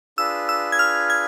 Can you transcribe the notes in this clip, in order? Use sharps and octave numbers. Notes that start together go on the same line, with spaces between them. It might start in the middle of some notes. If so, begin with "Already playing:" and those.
D4 F4 G#4 B4 E6
E6
G#6
F6
G#6